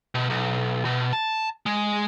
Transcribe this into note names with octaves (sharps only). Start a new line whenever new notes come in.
B2
B1
B2
A5
G#3